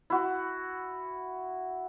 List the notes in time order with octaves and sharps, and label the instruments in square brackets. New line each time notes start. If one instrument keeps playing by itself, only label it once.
[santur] E4 F#4